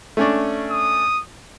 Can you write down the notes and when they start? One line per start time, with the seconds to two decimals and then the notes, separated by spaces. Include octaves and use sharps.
0.17 A3 C#4 D4
0.71 D#6